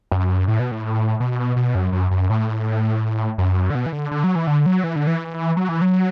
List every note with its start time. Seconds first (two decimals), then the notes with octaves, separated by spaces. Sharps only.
0.12 F#2
0.48 A2
0.60 B2
0.72 A2
1.20 B2
1.56 B2
1.75 F#2
1.93 F#2
2.11 F#2
2.30 A2
3.38 F#2
3.70 D3
3.75 B2
3.86 E3
3.93 D3
4.12 D3
4.24 F#3
4.35 E3
4.47 D3
4.66 F#3
4.84 E3
4.96 D3
5.07 E3
5.57 F#3
5.69 E3
5.82 F#3